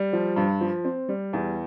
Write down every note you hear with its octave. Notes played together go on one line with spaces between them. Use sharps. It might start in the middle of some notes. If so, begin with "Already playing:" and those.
Already playing: G3
F3
G2
F3
C4
G3
E2